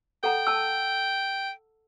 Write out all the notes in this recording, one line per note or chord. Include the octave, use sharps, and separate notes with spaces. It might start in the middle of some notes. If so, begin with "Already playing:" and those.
A4 F#5 G5 A#5
A5 E6